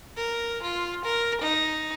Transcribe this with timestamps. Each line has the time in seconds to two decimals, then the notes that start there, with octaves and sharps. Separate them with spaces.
0.17 A#4
0.62 F4
1.04 A#4
1.41 D#4